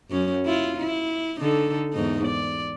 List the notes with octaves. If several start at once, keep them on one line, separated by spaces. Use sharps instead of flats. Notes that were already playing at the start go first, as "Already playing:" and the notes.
F#2 C#4
E4 F4
E4
D3 D#4 A4
E2 G#2 D#4
D5